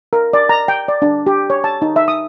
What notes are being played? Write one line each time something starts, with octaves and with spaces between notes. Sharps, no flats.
A#4
D5
A#5
G5
D5
D4
G4
C#5
A5
D#4
E5
D#6